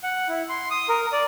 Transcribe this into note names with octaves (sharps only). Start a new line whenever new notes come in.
F#5
E4
C6
D#6
A#4
D5